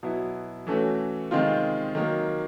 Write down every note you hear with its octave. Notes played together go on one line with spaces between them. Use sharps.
B2 F#3 B3 E4
E3 A3 C#4 F#4
C3 D#3 G#3 C4 F4
D#3 F#3 A#3